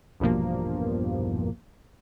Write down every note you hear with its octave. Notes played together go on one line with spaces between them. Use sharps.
A#1 E2 G2 B2 F3 A#3